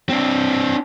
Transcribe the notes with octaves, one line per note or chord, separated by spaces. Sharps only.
C4 D4